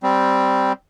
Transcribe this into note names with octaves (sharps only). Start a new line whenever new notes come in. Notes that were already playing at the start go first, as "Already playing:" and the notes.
G3 C4